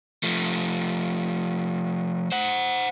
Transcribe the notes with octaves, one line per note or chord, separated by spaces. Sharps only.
F3 A3
C5 F#5